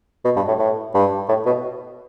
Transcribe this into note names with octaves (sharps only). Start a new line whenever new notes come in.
B2
G2
A2
A2
G2
A2
B2